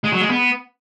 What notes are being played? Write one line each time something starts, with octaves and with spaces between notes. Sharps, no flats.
G#3
F#3
G#3
B3